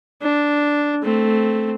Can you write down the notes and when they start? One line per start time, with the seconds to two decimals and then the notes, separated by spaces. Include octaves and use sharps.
0.22 D4
1.03 A3 C4